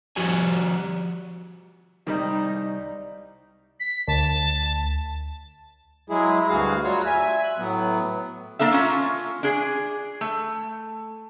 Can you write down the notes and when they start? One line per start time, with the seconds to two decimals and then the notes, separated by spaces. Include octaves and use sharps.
0.16 F3 F#4 G4 G#5
2.07 C2 D#3 G3 D#4
3.80 B6
4.08 D2 A5
6.10 F#3 G#3 E4 G#4
6.49 D2 G2 F#4 G#4 F5
6.84 F#3 G3 F4 F#4 C#5
7.06 E5 G#5
7.43 F#6
7.58 A2 F#3 B3
8.59 A#3 D4 A4 E5
8.72 C#4 F4
9.43 D4 G#4
10.21 A3